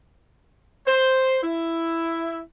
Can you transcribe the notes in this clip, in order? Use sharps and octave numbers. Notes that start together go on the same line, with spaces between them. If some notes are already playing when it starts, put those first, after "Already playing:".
C5
E4